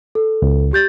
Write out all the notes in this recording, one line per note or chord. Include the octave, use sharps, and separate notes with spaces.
A4
C#2
G4 G6 A6